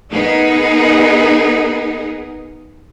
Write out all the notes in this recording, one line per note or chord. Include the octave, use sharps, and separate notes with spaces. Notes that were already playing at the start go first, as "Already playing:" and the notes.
B3 D#4 G#4 A#4